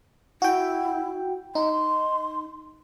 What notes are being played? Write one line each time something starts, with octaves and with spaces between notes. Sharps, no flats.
E4 F#4 G5
D#4 C6